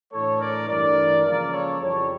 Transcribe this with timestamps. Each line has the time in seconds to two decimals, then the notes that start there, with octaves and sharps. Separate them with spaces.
0.12 A2 E3 A3 D4 A4 C#5
0.40 A#4 D5
0.68 G2 E3 A3 D4 A#4 D5
1.24 C#2 C#3 F3 A#3 A#4 D5
1.52 A4 C#5
1.80 F2 C#3 E3 G3 A4 C#5